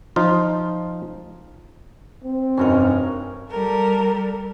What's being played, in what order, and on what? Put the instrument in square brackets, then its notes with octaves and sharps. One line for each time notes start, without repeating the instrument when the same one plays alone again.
[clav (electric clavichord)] F3 D#4 F4
[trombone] C4
[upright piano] F1 D#4 [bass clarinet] G2 [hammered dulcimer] C#4 F#4 A#4
[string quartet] G3 A4 A#4